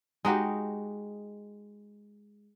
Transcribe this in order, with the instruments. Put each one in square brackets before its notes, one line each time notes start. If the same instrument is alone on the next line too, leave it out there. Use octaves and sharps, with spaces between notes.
[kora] G#3 D#4 F#4 G4